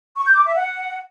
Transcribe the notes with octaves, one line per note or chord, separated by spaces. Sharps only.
C#6
G6
D6
E5
F#5